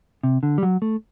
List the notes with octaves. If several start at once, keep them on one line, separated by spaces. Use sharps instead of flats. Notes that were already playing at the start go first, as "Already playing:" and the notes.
C3
D3
G3
F#3
A3